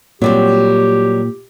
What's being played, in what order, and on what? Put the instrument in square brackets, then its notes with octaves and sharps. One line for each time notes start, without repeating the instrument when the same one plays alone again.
[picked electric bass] A#2 [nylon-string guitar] F#3 G3 C4 [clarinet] G4